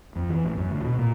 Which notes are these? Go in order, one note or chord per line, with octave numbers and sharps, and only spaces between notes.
F2
E3
A1
F#2
D2
B2
A#2